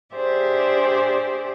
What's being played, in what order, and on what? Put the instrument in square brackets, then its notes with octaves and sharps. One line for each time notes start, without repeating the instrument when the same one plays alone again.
[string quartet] D4 G4 G#4 C5 D5 E5